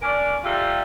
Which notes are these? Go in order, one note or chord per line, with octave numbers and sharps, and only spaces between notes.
C#4 D4 A#4 D5
C3 G3 F4 A4